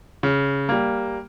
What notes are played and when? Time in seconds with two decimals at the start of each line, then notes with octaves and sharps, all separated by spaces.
0.23 C#3
0.69 G3 A#3